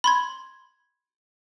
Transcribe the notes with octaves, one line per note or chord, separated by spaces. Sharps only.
B5 C6 G#6